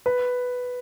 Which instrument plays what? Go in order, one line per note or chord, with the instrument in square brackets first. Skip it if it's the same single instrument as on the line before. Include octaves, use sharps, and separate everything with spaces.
[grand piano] B4